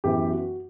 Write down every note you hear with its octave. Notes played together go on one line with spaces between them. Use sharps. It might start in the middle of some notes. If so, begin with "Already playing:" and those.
F#2 E3 B3 G4
F#4